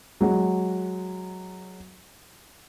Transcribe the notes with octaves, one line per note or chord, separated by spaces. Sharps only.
F#3 G#3